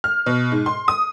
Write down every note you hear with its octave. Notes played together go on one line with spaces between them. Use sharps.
F6
B2
G#2
C6
D#6